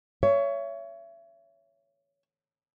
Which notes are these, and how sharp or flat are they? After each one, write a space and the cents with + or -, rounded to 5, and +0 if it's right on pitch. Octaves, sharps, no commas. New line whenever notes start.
C#5 +20 E5 +30